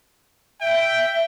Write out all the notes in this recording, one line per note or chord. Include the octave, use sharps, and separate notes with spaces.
E5 G5